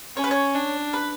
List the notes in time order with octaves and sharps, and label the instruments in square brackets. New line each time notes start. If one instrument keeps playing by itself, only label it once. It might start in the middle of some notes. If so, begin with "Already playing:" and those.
[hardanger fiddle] C#4 [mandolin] C#5
[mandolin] B4
C#5
[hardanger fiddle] D4
[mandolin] B4